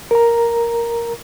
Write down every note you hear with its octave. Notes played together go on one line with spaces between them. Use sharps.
A#4 A#5